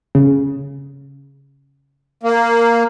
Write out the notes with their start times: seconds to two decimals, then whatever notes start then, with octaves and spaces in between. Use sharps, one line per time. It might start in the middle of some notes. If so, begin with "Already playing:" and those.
0.15 C#3
2.23 A#3